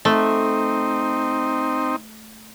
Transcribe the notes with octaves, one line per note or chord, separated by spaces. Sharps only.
A3 C4 D#4